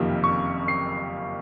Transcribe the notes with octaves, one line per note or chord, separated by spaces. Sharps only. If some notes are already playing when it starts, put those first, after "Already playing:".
Already playing: F#1 F2 C3 D#3 A#3
C#6
C7